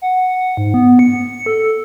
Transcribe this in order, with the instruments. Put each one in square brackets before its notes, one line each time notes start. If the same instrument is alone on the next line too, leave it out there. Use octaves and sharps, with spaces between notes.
[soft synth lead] F#5
G#2
B3
C#7
A4